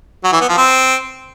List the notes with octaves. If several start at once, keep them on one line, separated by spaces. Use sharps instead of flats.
F#3
E3
B3
F3
C4